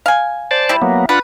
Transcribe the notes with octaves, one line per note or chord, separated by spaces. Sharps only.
F5 G#5
C5 D5 A5
G3 E4
F#3 A#3 B3
D4 F4 B4 F#5